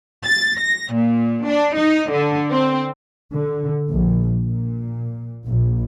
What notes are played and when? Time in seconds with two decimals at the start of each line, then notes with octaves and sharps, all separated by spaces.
0.24 A6
0.58 A#6
0.93 A#2
1.46 D4
1.75 D#4
2.10 D3
2.51 C4
3.33 D3
3.91 A#1
4.44 A#2
5.46 A#1